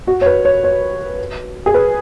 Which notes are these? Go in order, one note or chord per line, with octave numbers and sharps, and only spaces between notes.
F#4
C#5
B4
C#5
C#5
G#4
B4